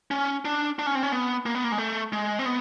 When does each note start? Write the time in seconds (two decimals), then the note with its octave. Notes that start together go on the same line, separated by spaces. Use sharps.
0.11 C#4
0.45 D4
0.79 D4
0.86 C#4
0.95 C4
1.03 C#4
1.12 B3
1.46 A#3
1.55 B3
1.64 A#3
1.72 G#3
1.78 A3
2.13 G#3
2.39 C4
2.46 B3